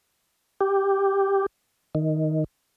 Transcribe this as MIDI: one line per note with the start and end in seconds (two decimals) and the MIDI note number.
0.61 1.46 67
1.95 2.44 51